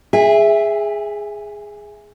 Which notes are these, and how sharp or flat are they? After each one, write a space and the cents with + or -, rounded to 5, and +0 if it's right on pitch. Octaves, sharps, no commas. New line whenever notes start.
G#4 +0 E5 +0 G#5 -45